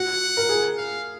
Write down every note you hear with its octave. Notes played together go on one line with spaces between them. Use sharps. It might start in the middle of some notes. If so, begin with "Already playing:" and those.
Already playing: F#4 F#5
A#4
G#4
F5